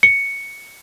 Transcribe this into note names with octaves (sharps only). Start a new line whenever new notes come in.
C#7